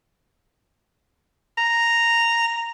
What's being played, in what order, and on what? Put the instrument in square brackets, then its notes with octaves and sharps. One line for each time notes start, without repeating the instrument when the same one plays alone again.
[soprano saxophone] A#5